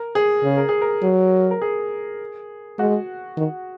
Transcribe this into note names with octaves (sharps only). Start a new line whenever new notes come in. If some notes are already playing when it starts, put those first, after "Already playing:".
Already playing: A#4
G#4
C#3
A#4
G#4
A#4
F#3
A#4
G#4
G#3 F#4
D#3